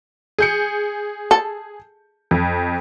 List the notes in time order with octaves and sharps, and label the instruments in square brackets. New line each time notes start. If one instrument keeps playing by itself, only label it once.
[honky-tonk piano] G#4 G6 C#7
[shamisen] A4
[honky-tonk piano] F2